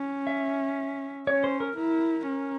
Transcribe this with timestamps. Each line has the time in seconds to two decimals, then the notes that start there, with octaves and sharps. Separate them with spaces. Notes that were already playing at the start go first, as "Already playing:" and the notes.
Already playing: C#4
0.27 E5
1.27 C#4 C#5
1.44 C5
1.60 A#4
1.77 E4 A#4
2.27 C#4